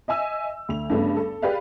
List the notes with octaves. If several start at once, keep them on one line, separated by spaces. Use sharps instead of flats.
D#5 E5 G#5 E6
D2 F7
G2 C#3 A3 B3 C#4 D4
A4
G4 G#4 B4 D5 F5